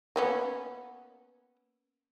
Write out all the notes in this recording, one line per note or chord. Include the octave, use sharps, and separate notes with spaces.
A#3 B3 C#4